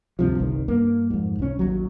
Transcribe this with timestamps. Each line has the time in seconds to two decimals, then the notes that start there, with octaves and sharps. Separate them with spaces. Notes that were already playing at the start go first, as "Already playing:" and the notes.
0.19 D2 G2 C3 F3
0.39 G1 C2 D#3
0.68 G2 A#3
1.10 F2 G#2
1.39 C2 C#4
1.59 A1 D#2 F#3